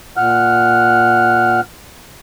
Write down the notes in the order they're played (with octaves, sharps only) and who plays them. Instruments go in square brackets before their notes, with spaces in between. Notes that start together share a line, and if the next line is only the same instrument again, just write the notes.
[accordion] A#2 F#5 F6 F#6